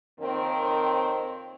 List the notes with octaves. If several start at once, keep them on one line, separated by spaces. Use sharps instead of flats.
F2 D#3 A#3 C4 A#4 C#5